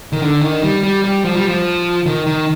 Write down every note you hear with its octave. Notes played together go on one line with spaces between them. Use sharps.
D#3
D3
D#3
G3
G3
G3
F3
G3
F3
D#3
D#3